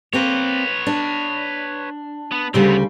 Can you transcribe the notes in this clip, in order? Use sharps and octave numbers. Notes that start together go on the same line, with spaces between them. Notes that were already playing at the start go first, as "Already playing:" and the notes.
A#3 C4 B4 C#5
D4
B3
D2 C#3 G3 B3 C4